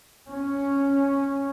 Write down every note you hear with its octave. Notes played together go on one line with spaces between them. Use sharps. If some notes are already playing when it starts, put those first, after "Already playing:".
C#4